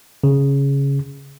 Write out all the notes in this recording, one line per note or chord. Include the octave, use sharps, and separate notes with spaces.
C#3